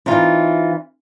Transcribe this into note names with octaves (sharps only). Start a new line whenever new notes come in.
E3 C4 D#4 F4